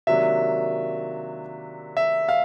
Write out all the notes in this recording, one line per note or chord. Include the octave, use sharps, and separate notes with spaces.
C3 D#3 F#3 A#3 D4 E5
E5
F5